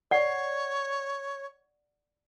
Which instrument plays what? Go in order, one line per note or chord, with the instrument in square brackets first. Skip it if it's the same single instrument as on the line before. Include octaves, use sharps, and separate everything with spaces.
[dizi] C#5 [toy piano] D5 F#5